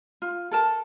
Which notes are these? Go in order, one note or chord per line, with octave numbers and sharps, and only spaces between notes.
F4
A4 A#4 A5